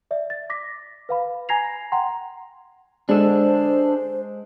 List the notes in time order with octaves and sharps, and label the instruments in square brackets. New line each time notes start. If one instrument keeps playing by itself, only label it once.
[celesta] D5 E5
A6
D6 A#6 B6
B4 F5 B5
G#5 A#5 G#6 A#6 C7 F7
F#5 G5 A#5 C6
[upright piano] G#3 [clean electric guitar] D4 A4 [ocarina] C5